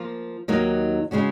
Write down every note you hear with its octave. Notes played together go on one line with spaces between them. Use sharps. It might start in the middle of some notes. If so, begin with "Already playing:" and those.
Already playing: F3 A#3 F4
D#2 D#3 F#3 A#3 D#4
C#3 G#3 C#4 F#4